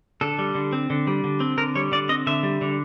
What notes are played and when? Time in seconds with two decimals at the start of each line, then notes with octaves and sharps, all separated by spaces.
0.21 D3 A4
0.39 G3
0.55 D3
0.73 C4
0.90 D3
1.07 G3
1.24 D3
1.40 C4
1.57 D3 A#4
1.75 G3 C#5
1.92 D3 D5
2.09 C4 D#5
2.27 D3 E5
2.43 G3
2.61 D3